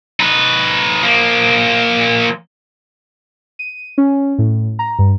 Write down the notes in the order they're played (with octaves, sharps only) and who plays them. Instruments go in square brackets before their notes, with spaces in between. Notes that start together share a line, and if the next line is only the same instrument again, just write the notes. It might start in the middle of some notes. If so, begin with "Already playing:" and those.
[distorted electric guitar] D#4 B4
F3 A#3
[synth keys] D#7
C#4
A2
A#5
G2